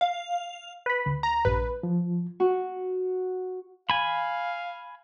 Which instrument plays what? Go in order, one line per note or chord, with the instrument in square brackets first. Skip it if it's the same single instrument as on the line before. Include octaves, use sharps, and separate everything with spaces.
[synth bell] F5
[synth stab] B4 B5
D2
[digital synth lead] A#5
[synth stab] A#1 G2 [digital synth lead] B4
[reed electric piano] F3
[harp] F#4
[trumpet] F5 [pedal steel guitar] G#5 B5